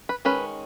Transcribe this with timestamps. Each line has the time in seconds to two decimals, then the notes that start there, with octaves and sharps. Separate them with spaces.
0.09 B4
0.25 D#3 G#3 C#4 B4